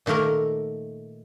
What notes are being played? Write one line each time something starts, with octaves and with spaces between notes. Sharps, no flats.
A#2 D#3 A3 A#3 A#4